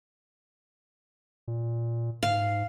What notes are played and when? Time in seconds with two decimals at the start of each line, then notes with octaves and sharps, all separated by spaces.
1.48 A#2
2.23 G#2 F5